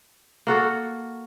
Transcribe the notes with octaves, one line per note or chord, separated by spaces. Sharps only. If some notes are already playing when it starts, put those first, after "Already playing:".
A#3 F#4 A4